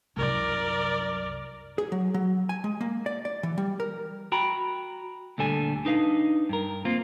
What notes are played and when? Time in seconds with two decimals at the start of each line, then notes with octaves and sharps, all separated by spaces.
0.17 C2 F#2 A#4 D5
1.78 G#4
1.92 F#3
2.14 F#3
2.49 G#5
2.64 G#3
2.81 A#3
3.06 D5
3.25 D5
3.43 E3
3.58 G3
3.80 A#4
4.32 F#4 G5 A#5 B5
5.38 D2 A#2 D3 G3 A4 G#5
5.85 D4 D#4 B4 F5
6.49 G2 A#4
6.85 A#3 C4 F4